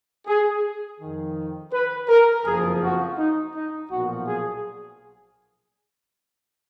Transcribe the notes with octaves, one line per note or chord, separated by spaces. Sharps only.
G#4
F2 D#3
B4
A#4
F#1 F2 F3 G#4
F#4
D#4
D#4
B1 A#2 F3 F#4
G#4